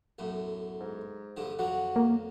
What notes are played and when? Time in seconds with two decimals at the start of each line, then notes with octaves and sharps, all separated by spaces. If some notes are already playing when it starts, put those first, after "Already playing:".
0.19 B1 F#2 A2
0.80 G#2
1.37 A#1 G2 D3
1.59 F2 D3 F#3 F#4
1.96 A#3